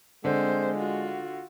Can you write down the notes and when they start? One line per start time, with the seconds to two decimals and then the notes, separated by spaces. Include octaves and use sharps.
0.25 D3 G#3 C4 C5
0.76 F4 F#4